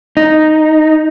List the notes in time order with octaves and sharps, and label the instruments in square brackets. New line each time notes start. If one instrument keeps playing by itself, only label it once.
[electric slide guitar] D#4